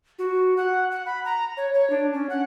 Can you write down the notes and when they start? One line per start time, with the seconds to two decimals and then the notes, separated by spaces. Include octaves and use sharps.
0.19 F#4
0.57 F#5
0.91 F#5
1.06 B5
1.25 A#5
1.57 C#5
1.74 C#5
1.90 D4
2.13 C#4
2.30 F#5